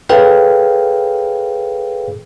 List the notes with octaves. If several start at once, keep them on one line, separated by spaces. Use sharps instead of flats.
G#4 A4 B4 C#5 F5 G5